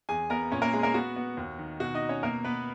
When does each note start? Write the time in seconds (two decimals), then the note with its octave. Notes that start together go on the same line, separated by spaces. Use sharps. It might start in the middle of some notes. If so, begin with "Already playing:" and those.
0.09 E2 G#4 G#5
0.30 B3 A#4 A#5
0.52 A#2 C#4 C#5
0.62 A#3 A#4
0.73 G#3 A#3 G#4
0.83 A#3 A#4
0.94 B3 F#4
1.16 B3
1.37 D#2
1.59 D#3
1.80 B2 F#4
1.94 D#4 D#5
2.02 B2
2.09 C#4 C#5
2.23 B2 A#3 A#4
2.45 B2 B3 B4